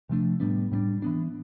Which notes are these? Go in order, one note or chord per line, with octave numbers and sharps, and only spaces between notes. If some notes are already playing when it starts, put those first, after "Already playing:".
C3 F3 A3 D4
A2 G3 B3 D4
A2 G3 B3 D4
E3 B3 D4